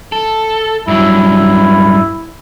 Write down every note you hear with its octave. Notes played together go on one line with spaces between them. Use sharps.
A4
G2 F#3 E4